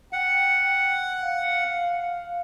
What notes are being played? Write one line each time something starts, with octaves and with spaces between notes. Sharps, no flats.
F#5 G5
F5